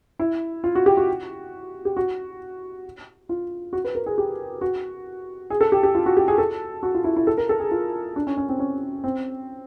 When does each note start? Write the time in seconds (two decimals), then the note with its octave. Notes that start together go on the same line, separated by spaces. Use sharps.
0.19 E4
0.64 F4
0.75 F#4
0.86 G4
0.97 F#4
1.85 G4
1.97 F#4
3.29 F4
3.73 F#4
3.85 B4
3.95 A#4
4.06 G#4
4.18 G4
4.61 F#4
5.50 G#4
5.61 A4
5.72 G4
5.83 G4
5.95 F4
6.06 F#4
6.17 G4
6.28 G#4
6.38 A4
6.83 F#4
6.94 F4
7.04 E4
7.16 E4
7.27 A4
7.38 A#4
7.49 A4
7.60 G#4
7.71 F4
8.16 D4
8.27 C#4
8.37 C#4
8.49 C4
8.59 C#4
9.04 C4